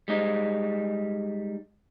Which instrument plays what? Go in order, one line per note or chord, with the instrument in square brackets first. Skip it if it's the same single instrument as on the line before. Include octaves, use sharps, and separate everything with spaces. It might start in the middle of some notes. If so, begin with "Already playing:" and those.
[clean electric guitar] G3 G#3 D#4